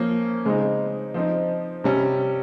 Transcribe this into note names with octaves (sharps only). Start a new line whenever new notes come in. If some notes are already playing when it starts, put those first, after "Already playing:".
Already playing: F3 A#3 C#4
C#3 G#3 C4 D#4
F3 C4 D#4
C3 G3 C#4